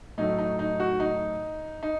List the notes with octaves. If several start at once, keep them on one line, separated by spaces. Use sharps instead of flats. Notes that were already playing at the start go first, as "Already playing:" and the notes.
A2 F#3 A3 D#4
D#4
D#4
F#4
D#4
D#4